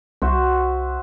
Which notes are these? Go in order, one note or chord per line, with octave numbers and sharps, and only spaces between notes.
C2 F#4 C5 E5